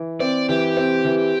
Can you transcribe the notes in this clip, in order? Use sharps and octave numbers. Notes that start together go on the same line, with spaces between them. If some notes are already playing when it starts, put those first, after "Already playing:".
Already playing: E3
C4 D5
E3 G4
C4
E3